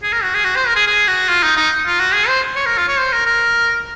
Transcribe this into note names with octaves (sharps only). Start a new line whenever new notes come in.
G#4
A#4
F#4
G#4
F#4
C5
A#4
G#4
G#4
F#4
F4
D#4
D#4
F4
F#4
G#4
C5
C#5
A#4
F4
C#5
C5
A#4
A#4